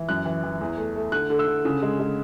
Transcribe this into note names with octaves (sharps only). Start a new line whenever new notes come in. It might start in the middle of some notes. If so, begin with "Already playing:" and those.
Already playing: E3
F#2 F#6
E3
E3
E2
A3
A3
D3 F#6
D3
E6
D3
C#3
G#3
G#3